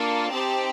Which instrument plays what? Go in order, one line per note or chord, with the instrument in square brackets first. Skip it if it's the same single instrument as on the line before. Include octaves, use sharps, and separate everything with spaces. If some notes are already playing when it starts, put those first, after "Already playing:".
Already playing: [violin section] A#3 D4 F4 A4
C4 D#4 G4 A5